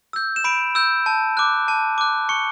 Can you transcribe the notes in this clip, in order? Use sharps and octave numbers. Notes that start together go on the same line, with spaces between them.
E6 G6
E7
B5 D7
E6 G6
A5
D6 F#6
A5
D6 F#6
C#6 C#7